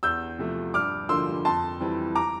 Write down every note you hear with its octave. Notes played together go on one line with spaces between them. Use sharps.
E2 E6 G6
C3 F3 A3
G2 D6 F6
D3 F3 A#3 C6 E6
F2 A5 C6
E3 G3 C4
A#5 D6